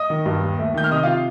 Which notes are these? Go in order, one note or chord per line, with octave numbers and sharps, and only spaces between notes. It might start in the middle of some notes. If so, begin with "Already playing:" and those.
Already playing: D#5 D#6
D#3
G2
D#2
A3
D#3 G6
F6
C3 D#5 D#6
F4 F5